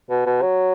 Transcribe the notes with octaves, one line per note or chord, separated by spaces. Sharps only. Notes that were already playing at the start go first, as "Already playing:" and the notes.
B2
B2
F#3